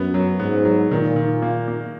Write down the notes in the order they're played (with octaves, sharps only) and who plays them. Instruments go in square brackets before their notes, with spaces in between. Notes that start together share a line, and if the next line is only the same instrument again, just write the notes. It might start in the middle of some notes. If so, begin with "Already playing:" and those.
Already playing: [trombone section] F#2 [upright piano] B3
[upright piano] F#3
[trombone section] G#2 [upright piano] B3
[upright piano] F#3
[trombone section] A#2 [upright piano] D#3
[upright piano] D#3
A#3
A#3